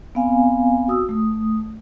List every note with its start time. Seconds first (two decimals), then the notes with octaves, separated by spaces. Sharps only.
0.15 B3 C4 F5 G#5
0.88 F#4 D#6 E6
1.09 A3 D#6